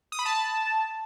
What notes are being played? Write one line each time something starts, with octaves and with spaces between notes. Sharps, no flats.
D#6
B5
A5